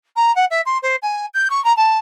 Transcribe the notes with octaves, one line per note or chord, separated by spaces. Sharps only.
A#5
F#5
E5
C6
C5
G#5
G6
C#6
A#5
A5